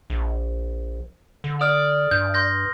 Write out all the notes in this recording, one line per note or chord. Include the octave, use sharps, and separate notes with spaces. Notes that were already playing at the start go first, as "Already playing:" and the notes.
A#1
D3
D5 D#6 F6
G2 G6
C6 G6 A#6